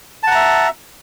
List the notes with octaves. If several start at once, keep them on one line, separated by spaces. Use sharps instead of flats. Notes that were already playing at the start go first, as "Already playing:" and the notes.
E5 F#5 A5 A#5